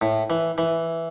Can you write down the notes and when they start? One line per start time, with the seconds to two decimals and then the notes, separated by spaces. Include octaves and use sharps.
0.01 A2
0.30 E3
0.58 E3